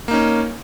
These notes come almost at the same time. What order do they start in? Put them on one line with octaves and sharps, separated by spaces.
A#3 D#4 C#4